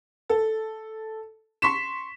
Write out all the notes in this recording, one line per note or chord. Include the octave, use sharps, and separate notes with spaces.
A4
C6 C#6 B6 E7